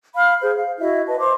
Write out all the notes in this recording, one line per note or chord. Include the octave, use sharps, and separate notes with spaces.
F5 B5 F6
G#4 C5
F5
E4 F#4 D#5 E5
B4 D#5 A5
C5 C6 D6